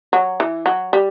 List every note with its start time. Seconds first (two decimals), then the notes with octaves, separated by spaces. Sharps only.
0.13 F#3
0.40 E3
0.66 F#3
0.93 G3